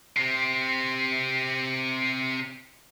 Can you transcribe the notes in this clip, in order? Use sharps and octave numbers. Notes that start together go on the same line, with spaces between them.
C3 C4